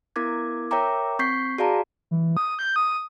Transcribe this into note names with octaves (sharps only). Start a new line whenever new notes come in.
B3 E4 A#4 D6 G#6
A#4 C#5 E5 G5 A#5 D6
C4 C#6 G6 B6 C7
F#4 G#4 D5 F5 A5 A#5
E3
D#6
G6
D#6